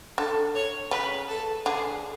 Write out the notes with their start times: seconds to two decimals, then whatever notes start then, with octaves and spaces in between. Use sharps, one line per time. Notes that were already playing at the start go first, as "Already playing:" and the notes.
0.18 D3 A4
0.55 C#5
0.91 C#3 B4
1.28 A4
1.66 D3 G#4